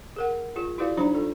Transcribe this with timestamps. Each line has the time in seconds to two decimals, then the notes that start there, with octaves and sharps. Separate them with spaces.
0.16 G#4 A#4 F#5
0.56 F4 G#4
0.78 E4 F#4 G#4 B4 D5 F5
0.97 F#3 D4 D#4 C5 A#5 B5
1.14 F4 A4